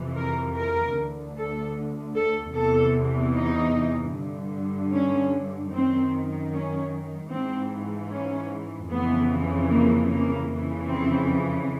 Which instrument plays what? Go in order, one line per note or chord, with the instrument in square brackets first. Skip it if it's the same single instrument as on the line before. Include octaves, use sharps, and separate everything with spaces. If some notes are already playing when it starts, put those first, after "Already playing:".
Already playing: [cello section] F2 C3 E3
A#4
A#4
D2
D3
A4
A4
E2 C3 E3 A4
D#4
G2 D3
C#4
F#2 D#3 C4
C#4
G#2 E3 C4
C#4
F2 C#3 E3 B3
A#3
A#3
F2 C#3 E3
C4